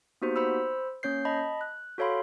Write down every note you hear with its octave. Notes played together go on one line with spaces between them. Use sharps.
A#3 B3 D#4 F#4 G4 C5
C5 B5 E6
A#3 C#4 C#5 G6 C7
D#5 A5 B5
F#6
F#4 A4 C#5 F5 B5 C6